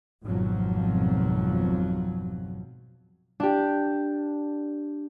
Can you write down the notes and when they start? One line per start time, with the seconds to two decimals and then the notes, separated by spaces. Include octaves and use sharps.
0.25 G#1 F2 B2 F3 F#3
3.40 D4 G4